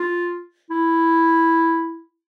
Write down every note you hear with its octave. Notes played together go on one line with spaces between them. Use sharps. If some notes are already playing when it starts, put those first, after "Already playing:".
Already playing: F4
E4